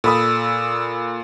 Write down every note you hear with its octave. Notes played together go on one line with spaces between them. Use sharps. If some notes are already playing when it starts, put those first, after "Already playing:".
A#2 A4 B5 D#6 E6